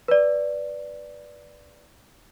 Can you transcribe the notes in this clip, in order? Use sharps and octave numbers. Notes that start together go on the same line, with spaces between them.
B4 D5